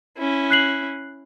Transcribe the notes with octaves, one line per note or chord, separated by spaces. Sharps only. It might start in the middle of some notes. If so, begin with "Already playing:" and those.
C#4 E4
F#6 C7 F#7